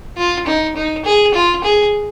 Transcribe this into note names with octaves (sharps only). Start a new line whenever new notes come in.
F4
D#4
D#4
G#4
F4
G#4